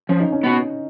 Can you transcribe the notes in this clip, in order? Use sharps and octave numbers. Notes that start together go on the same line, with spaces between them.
F3 C#4
D#4
C#4
B3 F#4